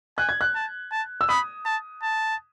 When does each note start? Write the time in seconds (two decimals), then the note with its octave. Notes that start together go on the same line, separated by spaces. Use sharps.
0.18 G#5 F#6
0.29 G#6
0.41 F#6
0.55 A5
0.91 A5
1.21 E6
1.29 B5 D#6
1.66 A5
2.03 A5